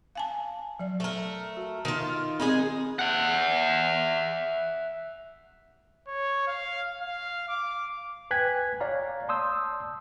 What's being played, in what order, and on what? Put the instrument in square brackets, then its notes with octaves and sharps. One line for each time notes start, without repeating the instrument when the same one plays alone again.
[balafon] F5 G#5 A5
F#3 D5
[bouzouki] A3 A#4
[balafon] F#4
[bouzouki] D#3 F4
[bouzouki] G#3 D#4 G#4 [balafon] C4
[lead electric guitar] E5 F#5
[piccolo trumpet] C#5
F5
F5
D6
[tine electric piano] B4 G5 G#5 F#6 G#6 B6
C#5 D5 F5 A#5
D5 A5 C6 D#6 E6 G6